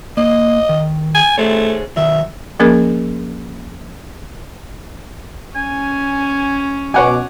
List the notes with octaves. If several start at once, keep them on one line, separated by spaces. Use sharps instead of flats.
A#3 D#5
D#3
G#5
A3 G#4 C5 C#5
D#3 F#3 E5
F3 A#3 C#4 G#4 A#4
C#4 G#5
B2 C#5 F#5 G#5 D6